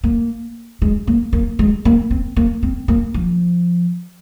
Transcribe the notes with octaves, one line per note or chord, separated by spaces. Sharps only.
A#3
G#3
A#3
A#3
G#3
A#3
C4
A#3
C4
A#3
F3